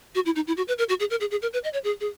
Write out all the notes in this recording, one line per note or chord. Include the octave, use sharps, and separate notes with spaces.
F#4
E4
D#4
E4
F#4
B4
A#4
F#4
G#4
A#4
G#4
G#4
A#4
B4
D#5
C#5
G#4
G#4